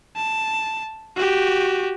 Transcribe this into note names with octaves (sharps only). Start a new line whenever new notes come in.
A5
F#4 G4